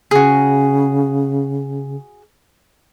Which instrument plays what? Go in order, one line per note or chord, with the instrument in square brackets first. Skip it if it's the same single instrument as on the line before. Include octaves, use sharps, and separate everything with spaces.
[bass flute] C#3 [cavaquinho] F#4 G#4